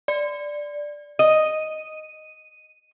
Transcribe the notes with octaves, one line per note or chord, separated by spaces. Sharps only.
D5
D#5 D#7